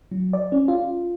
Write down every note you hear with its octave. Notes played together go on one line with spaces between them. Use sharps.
F#3
D5
C#4
F4